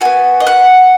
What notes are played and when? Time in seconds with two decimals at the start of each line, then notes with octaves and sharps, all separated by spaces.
0.01 B3 F#4 G#5
0.40 D#5
0.47 F#5